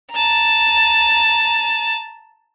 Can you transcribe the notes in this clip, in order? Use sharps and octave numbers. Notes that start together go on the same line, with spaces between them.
A5 A#5